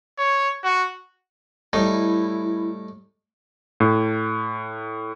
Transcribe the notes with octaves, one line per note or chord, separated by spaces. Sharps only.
C#5
F#4
A2 G3 D#4 E4
A2